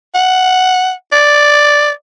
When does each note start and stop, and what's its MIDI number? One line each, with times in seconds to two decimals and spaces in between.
0.15 0.91 78
1.12 1.89 74